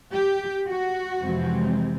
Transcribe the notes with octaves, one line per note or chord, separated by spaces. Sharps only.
G4
F#4
F2 C3 E3 G#3 C4